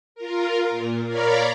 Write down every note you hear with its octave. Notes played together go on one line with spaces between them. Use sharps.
F4 A#4
A#2
A#4 C#5 D5 F5 A#5 B5